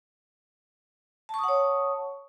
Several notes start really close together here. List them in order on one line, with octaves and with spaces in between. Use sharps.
A5 C#6 D#6 F#5 C#5